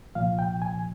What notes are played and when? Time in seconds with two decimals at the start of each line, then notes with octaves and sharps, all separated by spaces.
0.15 C2 A#2 F3 F5
0.39 G5
0.62 G#5